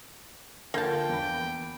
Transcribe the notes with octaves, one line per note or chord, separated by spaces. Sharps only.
D3 A#3 F4 G5 A5 G6
E2 B5